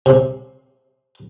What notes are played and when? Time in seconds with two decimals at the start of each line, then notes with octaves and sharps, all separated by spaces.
0.06 C3